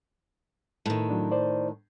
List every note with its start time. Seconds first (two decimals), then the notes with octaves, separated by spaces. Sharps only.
0.86 A2 D#3
1.10 F#3 D4
1.32 C5 D5